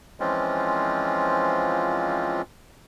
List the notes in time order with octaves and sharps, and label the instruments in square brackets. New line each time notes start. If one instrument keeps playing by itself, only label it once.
[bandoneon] E3 F3 G#3 C4 C#4 F4